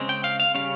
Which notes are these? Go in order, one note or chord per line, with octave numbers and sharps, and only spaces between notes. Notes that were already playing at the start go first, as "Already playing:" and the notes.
Already playing: C#3 G#3 C4
G5
F5
F5
C#3 G3 C#4 F5